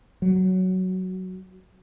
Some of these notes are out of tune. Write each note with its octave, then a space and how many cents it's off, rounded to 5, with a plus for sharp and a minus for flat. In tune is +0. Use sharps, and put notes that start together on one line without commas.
F#3 +5